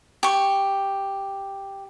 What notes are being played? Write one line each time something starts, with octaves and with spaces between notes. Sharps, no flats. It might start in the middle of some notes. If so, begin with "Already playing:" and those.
G4 C#6